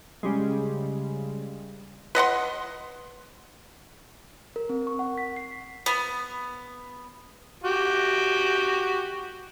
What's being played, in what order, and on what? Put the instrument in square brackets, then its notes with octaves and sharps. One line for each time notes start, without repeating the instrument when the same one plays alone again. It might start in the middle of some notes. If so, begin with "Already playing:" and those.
[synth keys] C#3 G3 G#3
[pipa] B4 D#5 F#5 C6
[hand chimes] A#4
C4
C#6
F#5
B6
C7
[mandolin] B3
[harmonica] F#4 G4